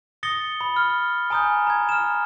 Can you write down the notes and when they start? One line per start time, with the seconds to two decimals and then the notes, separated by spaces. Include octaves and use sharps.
0.23 D#6 A6 A#6 C#7 G7
0.61 B5
0.76 F6
1.30 G#5 A#5 D#6 F6 G6
1.67 A#5 G#6
1.89 F6 E7